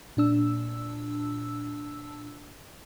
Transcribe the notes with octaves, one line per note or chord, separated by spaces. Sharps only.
A#2 D4 E6